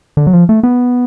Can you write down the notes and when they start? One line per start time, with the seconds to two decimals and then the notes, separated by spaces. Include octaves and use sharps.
0.17 D3
0.27 F#3
0.33 F3
0.49 A3
0.63 B3